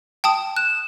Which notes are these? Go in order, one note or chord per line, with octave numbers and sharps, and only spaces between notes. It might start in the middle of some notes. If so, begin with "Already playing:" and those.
G5 A5 D#6
F#6 E7